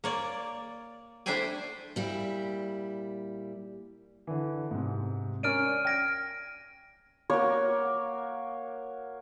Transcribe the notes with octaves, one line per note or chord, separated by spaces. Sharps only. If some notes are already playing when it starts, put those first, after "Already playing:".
A#3 C#5 D5
A3 D4 E4 C5 G5 G#5
A#2 G3 E4
D3 E3
G#2 C3
C#4 A#4 D5 F6 D7 D#7
G5 F6 G#6 A#6 D7
A#3 F#4 C#5